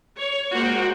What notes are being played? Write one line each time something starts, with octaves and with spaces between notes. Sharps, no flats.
C#5
G#3 A#3 F#4 C5 G5